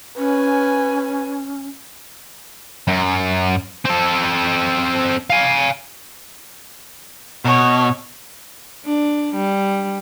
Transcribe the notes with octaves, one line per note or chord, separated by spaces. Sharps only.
C#4 B4 G#5
F#2
C4 A4
F5 G#5
B2 C#5
D4
G3